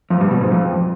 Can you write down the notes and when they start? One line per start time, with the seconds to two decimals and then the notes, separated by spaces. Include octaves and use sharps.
0.10 F2
0.21 G2
0.31 B2
0.41 G#2
0.51 F2